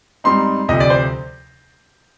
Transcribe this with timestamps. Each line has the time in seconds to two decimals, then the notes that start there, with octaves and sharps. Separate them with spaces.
0.24 G#2 G3 C4 D#4 C6
0.68 D2 C3 F3 D#5
0.80 D5
0.90 C5